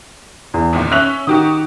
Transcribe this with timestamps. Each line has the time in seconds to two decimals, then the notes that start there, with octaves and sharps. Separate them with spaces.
0.54 E2
0.73 G#1 C#2 A#2
0.92 C#4 E5 F#6 F7
1.27 D#3 F#4 G4 D#6